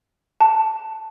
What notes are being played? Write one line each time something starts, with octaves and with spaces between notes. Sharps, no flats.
A5